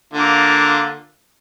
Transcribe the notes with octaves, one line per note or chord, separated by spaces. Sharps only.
D3 A#3 F4